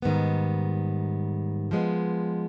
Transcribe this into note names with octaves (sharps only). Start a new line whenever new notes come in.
G#2 D#3 G3 B3
F3 G#3 B3